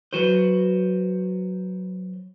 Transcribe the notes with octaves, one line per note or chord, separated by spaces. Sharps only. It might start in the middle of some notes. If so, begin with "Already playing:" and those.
F#3 F#4 B4 C5